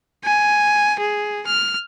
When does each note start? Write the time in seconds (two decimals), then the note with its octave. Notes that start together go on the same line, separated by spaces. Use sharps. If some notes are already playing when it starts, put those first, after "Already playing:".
0.24 G#5
1.00 G#4
1.47 F6